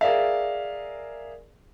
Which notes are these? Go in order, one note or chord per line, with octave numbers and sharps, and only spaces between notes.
G#4 A#4 D5 E5 F5